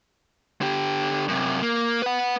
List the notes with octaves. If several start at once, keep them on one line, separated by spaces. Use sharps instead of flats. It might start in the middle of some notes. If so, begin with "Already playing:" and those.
D3 G4
F#2 C3
A#3
B4 F#5